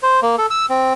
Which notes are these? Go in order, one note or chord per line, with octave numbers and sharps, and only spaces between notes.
C5
A#3
A4
E6
C4